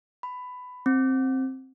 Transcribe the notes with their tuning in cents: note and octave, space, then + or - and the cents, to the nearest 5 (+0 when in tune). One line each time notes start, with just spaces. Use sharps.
B5 +15
C4 +10